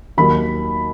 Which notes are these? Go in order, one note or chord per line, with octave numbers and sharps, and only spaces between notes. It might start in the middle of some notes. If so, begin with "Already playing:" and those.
D#2 D#3 F#3 B5